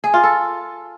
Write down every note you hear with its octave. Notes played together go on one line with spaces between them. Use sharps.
G#4
F4
A4